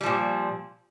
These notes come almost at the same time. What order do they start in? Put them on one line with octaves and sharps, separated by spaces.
G3 F3 A#2